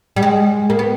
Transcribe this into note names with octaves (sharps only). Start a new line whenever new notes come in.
G3
G#3
A#3
B3